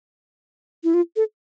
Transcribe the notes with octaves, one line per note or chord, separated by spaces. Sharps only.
E4
F4
A4